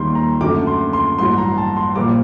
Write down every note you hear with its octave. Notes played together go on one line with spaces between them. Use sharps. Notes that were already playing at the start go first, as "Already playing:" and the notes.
Already playing: D#2 D#3 G3 C6
A#5
F#2 D3 F#3 A3 D6
C6
C6
A1 G2 F#3 C6
A#5
A5
C6
A#1 A#2 G3 A#3 D6